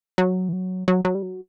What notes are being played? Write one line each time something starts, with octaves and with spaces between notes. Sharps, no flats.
F#3
E3
F#3
F#3
F#3
G3
F#3